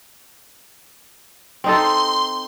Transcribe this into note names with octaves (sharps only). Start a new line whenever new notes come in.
C4 D#4 A4 C6